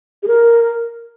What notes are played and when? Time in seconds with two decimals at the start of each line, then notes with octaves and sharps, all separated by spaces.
0.23 G#4
0.28 A#4